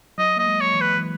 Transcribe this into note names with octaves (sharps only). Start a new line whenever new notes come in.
F#3 D#5
A#3 D#5
G#3
F#3 C#5
E3
B4
E3